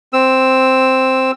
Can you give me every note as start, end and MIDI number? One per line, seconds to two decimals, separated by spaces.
0.13 1.31 60
0.13 1.31 88